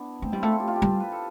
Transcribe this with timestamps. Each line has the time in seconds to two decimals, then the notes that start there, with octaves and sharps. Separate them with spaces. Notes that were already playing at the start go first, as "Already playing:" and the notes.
Already playing: B3 D4 E4
0.22 A3 C4
0.32 G3 E4
0.42 A3 F4
0.52 A4
0.60 G4
0.68 F4
0.76 G4
0.82 G3
1.00 B4
1.12 A4